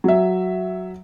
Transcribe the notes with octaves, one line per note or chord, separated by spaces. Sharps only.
F#3 E5